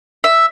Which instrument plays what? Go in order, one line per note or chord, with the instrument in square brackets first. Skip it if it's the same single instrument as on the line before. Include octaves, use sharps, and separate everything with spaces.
[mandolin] E5